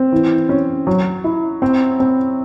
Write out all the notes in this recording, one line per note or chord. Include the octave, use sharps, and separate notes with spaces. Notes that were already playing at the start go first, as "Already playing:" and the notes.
Already playing: C4
E3
C#4
F#3
E4
C4
C4